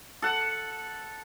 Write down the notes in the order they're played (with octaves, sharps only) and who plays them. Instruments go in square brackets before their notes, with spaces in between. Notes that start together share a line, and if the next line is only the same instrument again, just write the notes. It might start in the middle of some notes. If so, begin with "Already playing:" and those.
[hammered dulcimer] A4 F#5